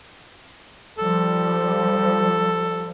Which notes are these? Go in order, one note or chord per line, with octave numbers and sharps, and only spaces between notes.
F3 G3 A4